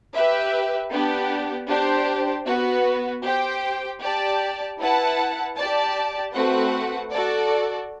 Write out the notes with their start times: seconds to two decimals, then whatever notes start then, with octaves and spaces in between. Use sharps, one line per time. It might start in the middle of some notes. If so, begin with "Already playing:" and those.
0.13 G4 B4 E5
0.91 B3 D4 G4
1.68 D4 G4 C5
2.46 B3 F#4 B4
3.23 G4 C5 G5
4.01 G4 D5 A5
4.79 E4 B4 F#5 A5
5.56 G4 D5 A5
6.34 A3 C4 F#4 B4 F#5
7.12 F#4 A4 D5